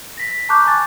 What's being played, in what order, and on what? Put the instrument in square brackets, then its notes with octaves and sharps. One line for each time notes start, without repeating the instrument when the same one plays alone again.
[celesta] A#6 B6
A5 A#5 C#6 D6 F#6 G6
G#5 C#6 A6